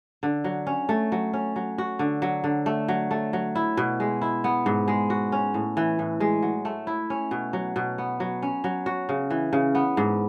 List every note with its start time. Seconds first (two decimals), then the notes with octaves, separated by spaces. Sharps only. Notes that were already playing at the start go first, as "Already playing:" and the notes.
0.23 D3
0.44 F#3
0.67 C#4
0.89 A3
1.12 F#3
1.33 C#4
1.56 F#3
1.78 F#4
1.99 D3
2.22 F#3
2.44 D3
2.66 A3
2.88 F#3
3.11 A3
3.33 F#3
3.55 E4
3.77 B2
4.00 G#3
4.22 E4
4.44 B3
4.66 G#2
4.88 G#3
5.10 F#4
5.32 C#4
5.54 A2
5.77 E3
5.99 A2
6.20 G#3
6.42 F#3
6.65 A3
6.87 E4
7.10 C#4
7.31 B2
7.53 F#3
7.76 B2
7.98 B3
8.20 F#3
8.42 C#4
8.64 F#3
8.86 F#4
9.09 C#3
9.30 E3
9.53 C#3
9.75 B3
9.97 G#2